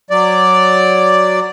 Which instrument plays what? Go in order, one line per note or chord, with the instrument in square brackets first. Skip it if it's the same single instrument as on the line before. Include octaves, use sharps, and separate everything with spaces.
[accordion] F#3 D5